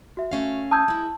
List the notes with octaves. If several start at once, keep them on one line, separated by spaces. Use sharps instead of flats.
F#4 E5
A3 C#4 F5
A5 D#6 E6 G6 G#6
G#3 E4